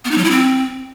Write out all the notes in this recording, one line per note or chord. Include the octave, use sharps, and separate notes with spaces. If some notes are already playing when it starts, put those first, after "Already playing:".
B3
D#4
F#3
E4
C4